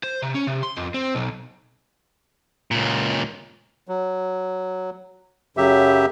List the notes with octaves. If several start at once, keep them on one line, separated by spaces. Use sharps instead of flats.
C5
C3
C#4
C3
C6
F2
C4
B1
C#2 A#2
F#3
F#2 C#3 F#3 G4 E5